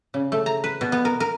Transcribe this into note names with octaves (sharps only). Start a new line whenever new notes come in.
C#3
A3
A#5
B4
B2
B3
A#4
A#4